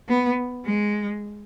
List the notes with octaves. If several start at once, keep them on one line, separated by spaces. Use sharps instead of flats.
B3
G#3